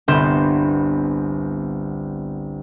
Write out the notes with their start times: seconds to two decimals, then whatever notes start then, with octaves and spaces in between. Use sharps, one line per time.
0.08 G1 C2 B3 C6 G6 E7